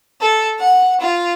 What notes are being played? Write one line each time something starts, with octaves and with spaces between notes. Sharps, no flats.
A4
F#5
F4